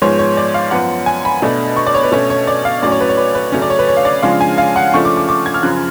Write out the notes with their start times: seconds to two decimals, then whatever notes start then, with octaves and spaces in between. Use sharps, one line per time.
0.02 G#2 F3 G#3 B3 C#5
0.19 C#5
0.37 D5
0.54 F5
0.71 F#2 F3 B3 F#5
1.06 G#5
1.25 B5
1.42 B2 A3 D4
1.76 C#6
1.86 D5
1.94 C#5
2.03 B4
2.12 B2 A3 C#4 C#5
2.30 C#5
2.47 D5
2.65 F5
2.83 A2 F#3 C#4 D5
2.92 C#5
3.01 B4
3.09 C#5
3.17 B4
3.35 B4
3.52 C#3 F#3 A3 C#4
3.62 D5
3.70 C#5
3.79 B4
3.88 C#5
3.97 F5
4.05 D5
4.22 C#3 F3 G#3 D4 F5
4.41 G#5
4.58 F5
4.76 F#5
4.94 C#3 F3 A3 D4 C#6
5.05 D6
5.17 D6
5.29 D6
5.46 G#6
5.54 F6
5.63 F#2 C#3 F3 F#6